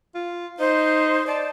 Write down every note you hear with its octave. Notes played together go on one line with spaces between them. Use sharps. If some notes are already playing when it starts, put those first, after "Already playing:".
F4
D#4 C5
D5 A5